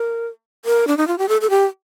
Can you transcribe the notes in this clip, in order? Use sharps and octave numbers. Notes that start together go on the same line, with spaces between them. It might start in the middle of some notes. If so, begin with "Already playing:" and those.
Already playing: A#4
A#4
D4
D#4
F4
G4
A4
A4
G4